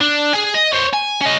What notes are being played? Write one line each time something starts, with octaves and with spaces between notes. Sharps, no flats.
D4
G#4 G#5
D#5
C5 C#5
G#5
C#4 D#5